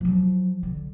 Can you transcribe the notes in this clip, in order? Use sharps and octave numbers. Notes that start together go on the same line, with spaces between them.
F3 F#3
D3